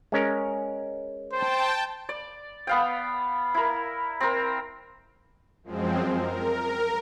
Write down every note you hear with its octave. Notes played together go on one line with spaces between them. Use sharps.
G#3 C#4 A#4
C5 G5 A5
D5
B3 F5 G5
E4 A#4
C4 A#4
F#2 F3 G#3 C4
A#4